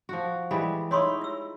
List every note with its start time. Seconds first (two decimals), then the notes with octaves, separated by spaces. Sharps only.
0.09 F3 F#4
0.51 E3 G3 G#3 B5
0.91 D#4 E4 C#5 C6 C#6
1.22 F4 E6